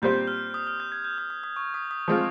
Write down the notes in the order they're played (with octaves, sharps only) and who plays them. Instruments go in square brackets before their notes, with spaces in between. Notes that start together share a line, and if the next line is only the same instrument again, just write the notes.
[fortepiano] A#2 G3 C4 G4 C5 [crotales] G6
[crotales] F6
D#6
F6
G6
G#6
G6
D#6
D#6
D#6
C#6
D#6
D#6
[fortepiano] F3 G#3 C4 F4 [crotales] D#6